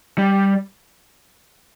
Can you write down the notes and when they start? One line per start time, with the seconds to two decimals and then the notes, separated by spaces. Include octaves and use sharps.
0.18 G3